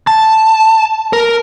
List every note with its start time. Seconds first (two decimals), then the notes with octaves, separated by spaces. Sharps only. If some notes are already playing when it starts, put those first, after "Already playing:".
0.07 A5
1.13 A#4